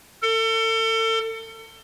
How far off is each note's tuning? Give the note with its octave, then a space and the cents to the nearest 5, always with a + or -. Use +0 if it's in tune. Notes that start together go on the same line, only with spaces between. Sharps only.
A4 +35